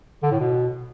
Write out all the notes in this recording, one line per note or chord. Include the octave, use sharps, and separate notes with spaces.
D3
A2
B2